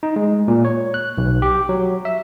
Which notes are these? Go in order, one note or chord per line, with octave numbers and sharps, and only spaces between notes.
D#4
G#3
A#2
C#5
F#6
B1
G4
F#3
E5